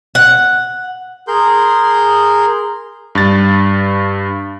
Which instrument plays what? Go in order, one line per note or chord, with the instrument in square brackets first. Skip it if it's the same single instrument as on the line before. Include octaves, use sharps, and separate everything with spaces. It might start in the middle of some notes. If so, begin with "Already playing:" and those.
[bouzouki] F#5
[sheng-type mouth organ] G#4 A#4 C6 G6
[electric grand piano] G2 A6